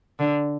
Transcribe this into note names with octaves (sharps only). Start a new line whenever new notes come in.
D3